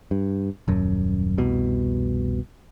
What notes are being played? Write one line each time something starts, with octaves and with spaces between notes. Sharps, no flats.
G2
D#1 F#2
F1 C2 B2